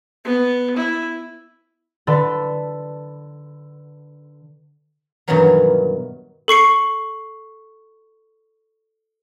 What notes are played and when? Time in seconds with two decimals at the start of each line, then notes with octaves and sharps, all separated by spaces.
0.25 B3
0.77 E4
2.07 D3 A4 B4
5.28 G2 B2 D#3 E3 F#3 A#3
6.48 A4 C#6 C7 C#7